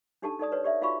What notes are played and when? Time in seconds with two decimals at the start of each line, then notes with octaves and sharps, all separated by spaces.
0.22 D4 D#4 G4 A4 A5
0.39 D#4 A4 D5 D#6
0.52 B4 C#5
0.64 G4 D5 E5
0.81 D#4 F4 F#4 F5 B5 C#6